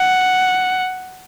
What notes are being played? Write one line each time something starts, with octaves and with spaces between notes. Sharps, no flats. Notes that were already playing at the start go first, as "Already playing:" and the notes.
Already playing: F#5